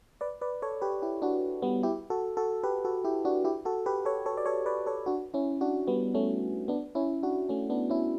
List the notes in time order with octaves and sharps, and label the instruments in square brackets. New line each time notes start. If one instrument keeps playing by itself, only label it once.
[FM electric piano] B4 D5
B4 D5
A4 C#5
G4 B4
E4 G4
D4 F#4
G3 B3
E4 G4
F#4 A4
F#4 A4
G4 B4
F#4 A4
E4 G4
D4 F#4
E4 G4
F#4 A4
G4 B4
A4 C#5
A4 C#5
D5
A4 C#5
B4 D5
A4 C#5
D4 F#4
C#4 E4
D4 F#4
G3 B3
A3 C#4
B3 D4
C#4 E4
D4 F#4
A3 C#4
B3 D4
C#4 E4